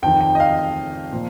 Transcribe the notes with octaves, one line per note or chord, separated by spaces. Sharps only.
F2 D#3 G5
G5
D#5
F5
A#2 F3